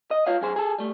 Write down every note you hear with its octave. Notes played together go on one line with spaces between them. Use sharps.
D#5
F4 C#5 F5
F#2 G#4 C5
G#4 A4
G3 A3